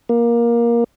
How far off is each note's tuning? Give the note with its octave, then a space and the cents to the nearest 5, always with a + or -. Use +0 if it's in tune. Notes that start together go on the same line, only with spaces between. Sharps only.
A#3 +15